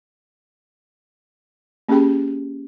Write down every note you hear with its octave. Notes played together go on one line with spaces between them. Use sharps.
A#3 C#4 G4 G#4 G5 B5